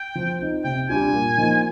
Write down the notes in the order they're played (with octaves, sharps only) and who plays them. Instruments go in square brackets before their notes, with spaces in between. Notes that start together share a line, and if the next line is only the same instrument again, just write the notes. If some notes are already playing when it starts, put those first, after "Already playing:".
Already playing: [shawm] G5
[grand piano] F3
C4 D#4
[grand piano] C3 [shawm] G5
[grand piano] G3 D4 F4 [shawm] G#5
[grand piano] A#2
F3 A#3 D#4